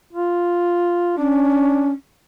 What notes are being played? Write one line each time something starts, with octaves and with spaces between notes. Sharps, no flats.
F4
C#4 D4